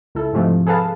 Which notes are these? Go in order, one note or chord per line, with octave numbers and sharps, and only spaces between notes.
C#2 E4 A4
G#2 C3 F3 G#3 A3
G#4 A4 B4 F5 A5